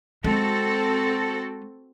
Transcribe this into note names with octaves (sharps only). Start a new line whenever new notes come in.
G#3 C4 F#4 A4